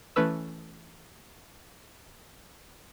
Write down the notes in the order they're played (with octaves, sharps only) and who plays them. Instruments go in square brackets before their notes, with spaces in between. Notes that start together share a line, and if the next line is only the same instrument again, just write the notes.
[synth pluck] E3 A3 C#4 B4 E6